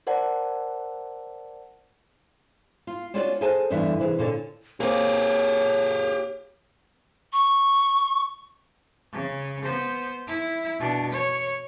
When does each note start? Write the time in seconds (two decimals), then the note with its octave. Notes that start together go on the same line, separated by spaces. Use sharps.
0.07 A#4 C5 D5 F#5 A5
2.87 F4
3.14 C#4 D4 F4 F#4 C#5 D5
3.41 G#4 A4 C5 G#5 A5
3.70 E2 G2 D3 E3 D4 E5
3.99 C3 E3 G#4
4.19 A#2 D3 A4 C#5
4.80 A#3 C4 G4 G#4 C#5
7.33 C#6
9.13 C#3
9.64 B3 C5
10.27 E4
10.79 B2 D4
11.12 C#5